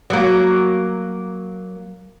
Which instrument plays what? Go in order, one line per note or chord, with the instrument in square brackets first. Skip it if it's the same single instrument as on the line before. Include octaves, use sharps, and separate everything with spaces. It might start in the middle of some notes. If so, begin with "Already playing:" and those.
[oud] F#3 A#3